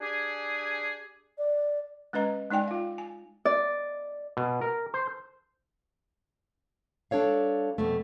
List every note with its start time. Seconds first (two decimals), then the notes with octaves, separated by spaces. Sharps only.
0.01 D4 G4 G#4
1.38 D5
2.13 G#3 C#4 B4 D#5 A#5
2.51 G#3 D#4 D5 G5 G#5
2.68 F4 F5
2.98 G#5
3.45 D5
4.37 B2
4.61 A#4
4.94 C5
7.11 G3 D4 A4 C#5 F5
7.78 F2 B2 A3